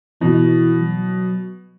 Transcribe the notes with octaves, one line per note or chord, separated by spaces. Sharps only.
B2 E3
F#3